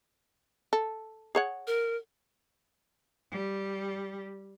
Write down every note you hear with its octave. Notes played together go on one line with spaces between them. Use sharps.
A4
G#4 C#5 F#5
A#4
G3